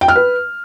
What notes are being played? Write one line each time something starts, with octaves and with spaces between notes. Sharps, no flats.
G5
F6
B4